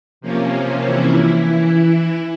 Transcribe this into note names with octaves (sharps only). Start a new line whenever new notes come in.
C3 F3 A#3 C#4
E3 E4